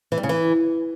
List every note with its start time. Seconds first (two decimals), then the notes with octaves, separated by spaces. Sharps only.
0.12 E3
0.18 G3
0.23 C#3
0.29 E3